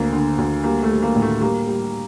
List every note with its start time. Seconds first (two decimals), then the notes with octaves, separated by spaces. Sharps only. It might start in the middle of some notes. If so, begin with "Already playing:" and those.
Already playing: D2 A#3
0.13 D3
0.38 D2
0.64 G3 A#3
0.83 A3
0.89 G3
1.02 A#3
1.15 A2
1.22 A3
1.41 G3 A#3
1.67 G3